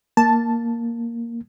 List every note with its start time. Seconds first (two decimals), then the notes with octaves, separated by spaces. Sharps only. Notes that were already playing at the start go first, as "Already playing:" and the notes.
0.17 A#3 A5